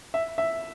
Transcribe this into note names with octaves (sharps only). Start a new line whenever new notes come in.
E5
E5